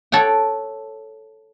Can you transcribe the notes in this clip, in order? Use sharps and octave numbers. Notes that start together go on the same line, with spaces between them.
A4 C#5 F#5 G5